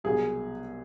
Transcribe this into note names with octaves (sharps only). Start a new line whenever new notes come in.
C2 B2 F#3 G#4